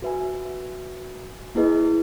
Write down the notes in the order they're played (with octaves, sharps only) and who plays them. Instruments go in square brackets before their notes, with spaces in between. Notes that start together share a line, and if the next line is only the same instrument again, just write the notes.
[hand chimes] F#4 B4 E5 G#5
A#3 E4 G#4 B4 D#5